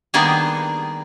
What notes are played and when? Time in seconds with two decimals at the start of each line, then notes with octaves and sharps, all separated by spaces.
0.14 D#3 G3 A#3 B3 D4 G#4